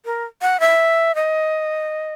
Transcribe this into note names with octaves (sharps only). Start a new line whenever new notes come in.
A#4
F#5
E5
D#5